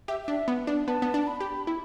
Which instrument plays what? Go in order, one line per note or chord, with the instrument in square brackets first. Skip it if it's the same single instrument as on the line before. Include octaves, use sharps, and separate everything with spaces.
[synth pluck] G4 [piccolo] E5
[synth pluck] D4 [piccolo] E5
[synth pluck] B3
D4
[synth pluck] B3 [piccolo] A5
[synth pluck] B3
D4
[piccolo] A5
B5
[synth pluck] G4
[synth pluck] E4 [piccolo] B5